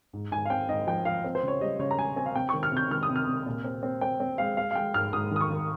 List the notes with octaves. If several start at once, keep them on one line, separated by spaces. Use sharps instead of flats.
G#2
G#2 G#5
F5
C4 G5
G#2 D#5
F3 G5
F3 F5
C4
C5
C#3 C#5
G3 D#5
C#3 C#5
A#5
C#3 G#5
C4 G#5
F5
C3 G5
D#3 C#6
F6
C3 G6
D#3 F6
D#6
C3
F6
C3
A#2
C4
C4
C4 G5
C4
G#3 F5
G#3 F5
F5
G#3 G5
G#2 F6
G#2 D#6
D#3 D#6
C#6
D#3